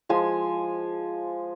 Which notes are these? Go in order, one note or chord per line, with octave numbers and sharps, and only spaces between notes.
F3 G#3 G#5